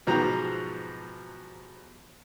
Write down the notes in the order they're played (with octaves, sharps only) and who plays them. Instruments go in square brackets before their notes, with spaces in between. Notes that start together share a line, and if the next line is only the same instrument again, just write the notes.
[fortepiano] G#2 B2 F3 F#3 G4 A#5